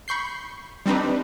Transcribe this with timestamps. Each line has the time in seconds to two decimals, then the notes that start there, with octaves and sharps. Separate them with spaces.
0.08 B5 C#6 G6 C7
0.86 G3 C4 D4 D#4 B4